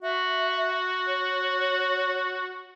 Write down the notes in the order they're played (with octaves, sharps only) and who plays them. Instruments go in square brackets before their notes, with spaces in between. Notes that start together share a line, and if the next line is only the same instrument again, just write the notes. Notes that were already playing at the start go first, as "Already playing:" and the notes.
[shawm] F#4 [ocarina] E5
[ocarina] C#5